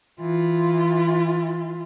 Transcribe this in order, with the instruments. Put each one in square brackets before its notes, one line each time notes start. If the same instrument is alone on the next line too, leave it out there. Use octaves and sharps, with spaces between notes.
[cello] E3 F4